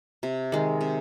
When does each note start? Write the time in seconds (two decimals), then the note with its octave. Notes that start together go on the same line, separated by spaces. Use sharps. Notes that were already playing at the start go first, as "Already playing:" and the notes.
0.23 C3
0.52 D#3 G#3
0.81 C3